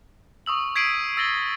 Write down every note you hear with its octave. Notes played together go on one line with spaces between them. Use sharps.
C#6 D#6 E6 F#7
G#6 B6 C7 D7 D#7 F#7
E6 A6 A#6 D7 G7